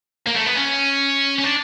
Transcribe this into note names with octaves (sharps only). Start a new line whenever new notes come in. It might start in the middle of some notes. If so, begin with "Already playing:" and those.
A#3
A3
B3
C#4
C#4
D4